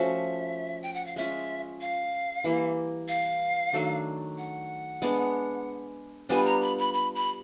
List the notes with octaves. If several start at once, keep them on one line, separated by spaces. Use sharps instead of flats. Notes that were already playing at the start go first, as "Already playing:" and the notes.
Already playing: F3 A3 C#4 F#4 E5
G5
F#5
F5
G#3 C#4 F4 E5
F5
E3 G3 A#3
F5
D#3 F#3 A3 D4
F#5
G#3 B3 D4
G3 B3 D4 F4 G#5
A#5
B5
B5
B5
B5